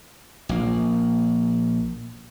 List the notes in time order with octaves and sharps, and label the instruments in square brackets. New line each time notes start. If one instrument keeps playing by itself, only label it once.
[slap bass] A#1 A#3